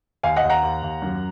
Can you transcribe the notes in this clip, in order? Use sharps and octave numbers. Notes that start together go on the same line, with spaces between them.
D#2 F5 G#5
D#5 F#5
D#2
F#5 A#5
D#2
D#2
F#2